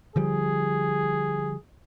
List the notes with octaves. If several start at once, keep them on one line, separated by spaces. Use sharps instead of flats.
D3 F3 G3 G#4